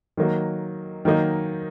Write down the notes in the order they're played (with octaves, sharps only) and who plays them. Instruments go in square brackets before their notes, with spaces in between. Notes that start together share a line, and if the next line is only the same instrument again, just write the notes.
[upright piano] D#3 F#3 A#3
D#3 F#3 A#3 D#4